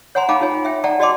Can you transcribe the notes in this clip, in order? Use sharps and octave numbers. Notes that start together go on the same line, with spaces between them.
C#5 F#5 G#5 A#5 C6
D#4 F5 G5 A5 B5 D6
D#4 F4 C#5 G#5
E5 G5
D5 F#5 G5 A5 A#5
F#4 D5 D#5 A5 C6 D6